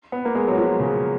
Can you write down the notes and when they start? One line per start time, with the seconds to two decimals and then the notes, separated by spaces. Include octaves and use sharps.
0.12 B3
0.25 A#3
0.35 G#3
0.48 F#3
0.57 F3
0.80 C#3